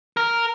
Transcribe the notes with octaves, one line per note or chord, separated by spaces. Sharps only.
A#4